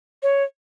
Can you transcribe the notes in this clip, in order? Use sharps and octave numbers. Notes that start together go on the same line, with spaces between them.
C#5